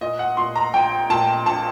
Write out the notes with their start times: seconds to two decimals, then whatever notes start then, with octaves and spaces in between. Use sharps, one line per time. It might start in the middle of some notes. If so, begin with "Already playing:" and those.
0.01 A#2 D#5
0.19 F#5
0.37 A#2 C6
0.56 A#5
0.73 A#1 G5
1.10 A#2 A5
1.46 A#1 A5